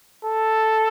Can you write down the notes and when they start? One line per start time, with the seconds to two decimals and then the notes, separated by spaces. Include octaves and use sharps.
0.25 A4